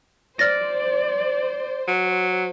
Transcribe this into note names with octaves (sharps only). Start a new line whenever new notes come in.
C5 D5 F6 A6 A#6
F#3